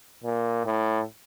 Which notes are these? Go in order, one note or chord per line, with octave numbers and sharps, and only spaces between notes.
A#2
A2